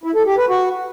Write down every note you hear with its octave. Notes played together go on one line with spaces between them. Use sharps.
E4
A4
G4
B4
F#4